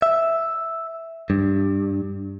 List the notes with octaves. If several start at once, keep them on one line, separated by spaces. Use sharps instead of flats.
E5
G2